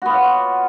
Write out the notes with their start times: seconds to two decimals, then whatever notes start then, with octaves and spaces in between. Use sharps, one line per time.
0.02 F#4
0.06 B3
0.09 F4
0.13 C#5